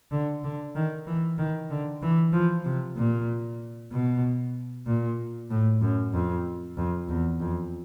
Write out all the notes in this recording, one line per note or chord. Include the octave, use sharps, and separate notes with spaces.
D3
D3
D#3
E3
D#3
D3
E3
F3
C3
A#2
B2
A#2
A2
F#2
F2
F2
E2
F2